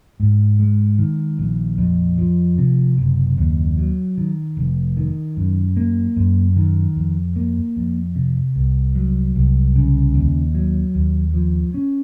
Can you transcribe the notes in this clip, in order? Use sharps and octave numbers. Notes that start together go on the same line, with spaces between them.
G#2
G#3
D#3
A#1
F2
F3
C3
F#1
D#2
F#3
D#3
F1
D#3
F#2
A#3
F#2
D#3
F2
A#3
F2
C3
C2
F#3
C2
C#3
D#2
F#3
D#2
F3
C#4